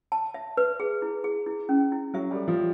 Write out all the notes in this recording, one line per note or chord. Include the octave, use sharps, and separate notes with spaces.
A5
E5
B4
G#4
E4
G#4
E4
C#4
E4
F#3 E5
G3
A4
F3
E5